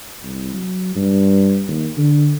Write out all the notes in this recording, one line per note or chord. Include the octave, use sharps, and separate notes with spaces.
C2
F#3
G2
D#2
D3